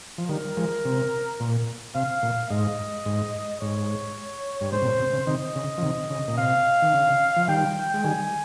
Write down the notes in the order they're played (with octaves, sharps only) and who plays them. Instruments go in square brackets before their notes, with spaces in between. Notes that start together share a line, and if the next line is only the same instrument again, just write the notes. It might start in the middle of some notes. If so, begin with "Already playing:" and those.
[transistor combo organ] F3
[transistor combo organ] D#3 G3 [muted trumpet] A#4
[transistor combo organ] F3 G#3
C3
A#2
[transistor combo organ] C3 [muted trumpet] F5
[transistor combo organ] A#2
[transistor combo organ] G#2 [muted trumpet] D#5
[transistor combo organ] G#2
[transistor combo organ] G#2 [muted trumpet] C#5
[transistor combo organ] G2
[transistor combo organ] G#2 [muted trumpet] C5
[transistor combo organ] C3
A#2
C3
C#3
[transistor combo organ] C3 D#3 [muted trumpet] D#5
[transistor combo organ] C#3
F3
C3 D#3
C#3
A#2
[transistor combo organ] C3 [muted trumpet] F5
[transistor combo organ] D#3
C#3
F3
[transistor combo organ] D#3 G3 [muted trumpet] G5
[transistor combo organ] G#3
[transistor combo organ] D#3 G3 [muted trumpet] G#5